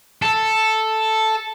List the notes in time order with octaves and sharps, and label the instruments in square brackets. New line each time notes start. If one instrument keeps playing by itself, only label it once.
[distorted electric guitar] A4